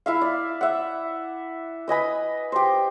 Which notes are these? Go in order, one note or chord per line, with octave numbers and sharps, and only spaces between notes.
E4 E5 F5
D5
E5 F#5
B4 D#5 G#5 B5
G4 C5